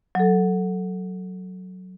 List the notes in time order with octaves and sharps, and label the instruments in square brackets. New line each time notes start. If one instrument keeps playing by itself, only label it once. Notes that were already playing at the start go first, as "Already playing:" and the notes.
[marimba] F#3 A4